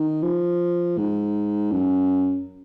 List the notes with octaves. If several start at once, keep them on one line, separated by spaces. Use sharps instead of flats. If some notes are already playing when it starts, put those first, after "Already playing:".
Already playing: D#3
F3
G#2
F#2